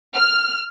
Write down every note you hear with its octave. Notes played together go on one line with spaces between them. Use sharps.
F6